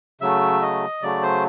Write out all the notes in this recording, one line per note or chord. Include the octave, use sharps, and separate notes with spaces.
C#3 F#3 A3 E5
D#5
C#3 F#3 A3 D5
C5